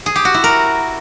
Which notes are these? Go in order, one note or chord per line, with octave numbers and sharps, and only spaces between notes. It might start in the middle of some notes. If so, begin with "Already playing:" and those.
G#4
G4
F#4
E4
A#4